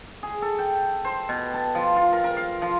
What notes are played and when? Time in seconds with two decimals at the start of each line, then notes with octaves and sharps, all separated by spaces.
0.23 G#4
0.42 A4
0.59 G5
1.05 C5
1.29 B2
1.54 A5
1.75 F3
1.96 F4
2.12 A#4
2.24 A#4
2.37 F5
2.62 F3